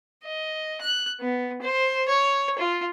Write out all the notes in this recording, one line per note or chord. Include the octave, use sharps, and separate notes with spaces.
D#5
F#6
B3
C5
C#5
F4